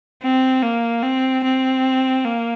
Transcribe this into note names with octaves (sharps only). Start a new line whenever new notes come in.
C4
A#3
C4
C4
A#3